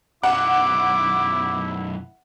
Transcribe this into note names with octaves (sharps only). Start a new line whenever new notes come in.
B1 F#2 E4 F#5 D6